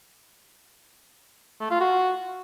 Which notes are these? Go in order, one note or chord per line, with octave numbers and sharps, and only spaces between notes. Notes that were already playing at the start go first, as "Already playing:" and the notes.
A3
F4
F#4